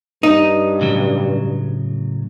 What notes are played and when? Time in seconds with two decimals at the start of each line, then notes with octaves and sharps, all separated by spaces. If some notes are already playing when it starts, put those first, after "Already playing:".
0.23 G2 D#4
0.81 A2 C#3 F#3